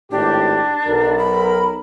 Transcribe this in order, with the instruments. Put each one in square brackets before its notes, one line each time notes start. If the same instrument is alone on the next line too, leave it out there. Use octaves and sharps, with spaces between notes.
[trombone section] G#1 A2 G4 [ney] D4
[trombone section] B1 A#4
[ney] B5